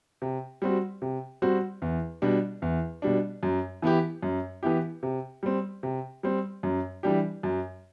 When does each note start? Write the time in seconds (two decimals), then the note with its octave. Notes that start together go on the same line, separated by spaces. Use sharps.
0.22 C3
0.62 G3 C4 F#4
1.02 C3
1.42 G3 C4 F#4
1.82 E2
2.22 B2 G3 D4
2.62 E2
3.02 B2 G3 D4
3.43 F#2
3.82 E3 B3 E4 G4
4.23 F#2
4.63 E3 B3 E4 G4
5.03 C3
5.43 G3 C4
5.83 C3
6.23 G3 C4
6.63 F#2
7.03 E3 G3 D4 G4
7.43 F#2